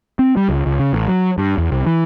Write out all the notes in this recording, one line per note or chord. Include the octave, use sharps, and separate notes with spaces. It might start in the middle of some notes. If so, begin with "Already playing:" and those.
C4
G3
C#2
C#2
C#3
A1
F#3
G2
E2
C2
E3